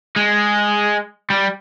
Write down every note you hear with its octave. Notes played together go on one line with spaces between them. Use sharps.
G#3
G3